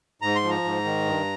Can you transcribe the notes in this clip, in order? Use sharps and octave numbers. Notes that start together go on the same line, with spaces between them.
G#2 A#5
C6
F3
A#5
G#2
D#3
G2